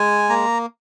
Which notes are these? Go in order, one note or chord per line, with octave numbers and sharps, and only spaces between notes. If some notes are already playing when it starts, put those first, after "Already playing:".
Already playing: G#3 G#5
A#3 A#5